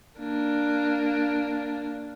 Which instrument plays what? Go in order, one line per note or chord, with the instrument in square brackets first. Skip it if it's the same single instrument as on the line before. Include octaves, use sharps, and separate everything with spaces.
[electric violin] A#3 D4